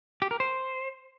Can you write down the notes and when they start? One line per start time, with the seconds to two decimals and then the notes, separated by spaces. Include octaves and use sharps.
0.22 G4
0.31 A#4
0.40 C5